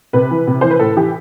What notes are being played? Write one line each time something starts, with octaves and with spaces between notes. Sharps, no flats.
C3 B4
E3
C3
E3 C5
B4
A2 A4
E3 G4